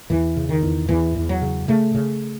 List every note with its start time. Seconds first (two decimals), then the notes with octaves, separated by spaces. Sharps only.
0.10 E2 E3
0.36 C#3
0.49 D#3
0.62 E2
0.89 E2 E3
1.15 E2
1.29 F#3
1.42 C#3
1.68 C#3 A3
1.95 C#3